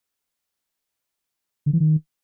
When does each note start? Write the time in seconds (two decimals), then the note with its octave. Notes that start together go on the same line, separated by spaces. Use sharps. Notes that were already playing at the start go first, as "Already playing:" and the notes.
1.66 D3
1.73 E3
1.80 D#3